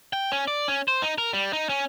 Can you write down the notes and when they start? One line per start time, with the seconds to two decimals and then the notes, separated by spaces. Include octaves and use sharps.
0.13 G5
0.32 C#4
0.48 D5
0.68 C#4
0.88 C5
1.02 D#4
1.18 A#4
1.33 G3
1.53 D#4
1.69 C#4